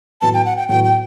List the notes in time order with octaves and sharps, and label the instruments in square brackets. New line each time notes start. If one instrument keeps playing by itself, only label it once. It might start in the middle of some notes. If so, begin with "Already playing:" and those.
[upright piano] A2 F#3 B3 [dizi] A5
[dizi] G5
F#5
G5
[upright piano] A2 F#3 B3 [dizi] G5
[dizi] G5